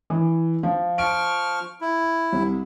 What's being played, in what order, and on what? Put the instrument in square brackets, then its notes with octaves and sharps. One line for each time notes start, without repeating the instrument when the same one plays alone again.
[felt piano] E3
F3
[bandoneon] F3 C#6 F6 [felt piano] D7
[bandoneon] E4
[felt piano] C2